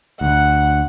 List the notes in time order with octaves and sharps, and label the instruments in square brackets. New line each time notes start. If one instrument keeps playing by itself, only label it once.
[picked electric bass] D2 [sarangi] F#5